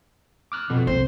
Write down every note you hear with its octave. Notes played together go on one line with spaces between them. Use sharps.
D6 F6 F#6
F2 B2
C2 C4 C5